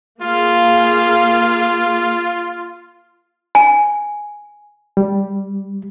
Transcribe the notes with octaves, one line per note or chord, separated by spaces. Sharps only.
A#3 F4 G#4 F5
G#5
G3